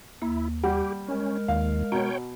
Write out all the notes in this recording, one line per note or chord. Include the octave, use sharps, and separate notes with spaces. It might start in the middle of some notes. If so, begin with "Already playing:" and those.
D#2 A#3 E4
G3 G4 F#5
G#3 C#4 A#4
D#2 F5
B2 C#5 G5 A#5